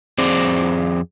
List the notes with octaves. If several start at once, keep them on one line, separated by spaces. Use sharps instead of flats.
F2 C4 G#4 C5 D5